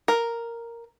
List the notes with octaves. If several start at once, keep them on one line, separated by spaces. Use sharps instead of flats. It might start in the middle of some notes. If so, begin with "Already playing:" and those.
A#4